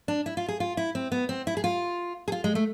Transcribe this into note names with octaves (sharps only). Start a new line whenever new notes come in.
D4
E4
F4
G#4
F4
E4
C4
B3
C4
E4
G#4
F4
G#4
F4
G#3
A3